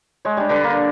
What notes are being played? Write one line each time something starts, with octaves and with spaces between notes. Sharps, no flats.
G#3 C#5
G3 D4
D3 B4 A5
A#3